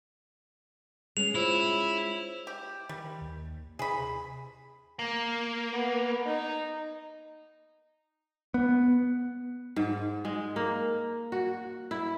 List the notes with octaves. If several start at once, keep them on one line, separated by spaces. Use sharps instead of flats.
G#3 C#4 C7 F7
E4 F4 C5 C#5
G4
D#3 G3
D#2
C3 G#4 B5
A#3
B3
D#4
B3
G#2
G#3
A#3
F#4
E4